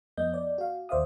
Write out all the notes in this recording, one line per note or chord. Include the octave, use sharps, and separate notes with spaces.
F2 B3 D#5 G6
D5
F#4 F5
D#2 C5 D5 E5 F5 D#6